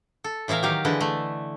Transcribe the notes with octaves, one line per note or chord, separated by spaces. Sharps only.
A4
A2 E3 E5 F5 A#5
D#3 F#3 D#4 G4 F5
D3 E3 G#3 B4 D#5
A3